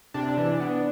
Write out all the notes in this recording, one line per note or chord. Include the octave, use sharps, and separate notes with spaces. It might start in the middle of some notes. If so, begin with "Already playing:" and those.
C3 D4
E3
B3